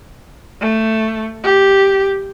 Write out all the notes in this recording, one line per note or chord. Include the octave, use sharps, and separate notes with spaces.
A3
G4